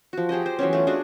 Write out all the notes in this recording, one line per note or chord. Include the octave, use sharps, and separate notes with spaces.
F3 F#4
G4 G#4 C5 D#5
C5
E3 F#3 B3 C#4
A3 F4
D4 F#4 G#4